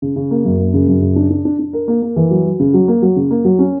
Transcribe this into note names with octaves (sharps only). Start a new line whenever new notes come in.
C#3
C#3
A#3
F#2
A#3
C#3
F#2
C#3
D4
D4
D4
D4
A#4
A#3
A#3
E3
F#3
F#3
C#3
F#3
A#3
F#3
C#3
A#3
F#3
C#4